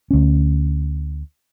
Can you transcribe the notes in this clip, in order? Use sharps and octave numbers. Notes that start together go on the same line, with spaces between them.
D2 C#4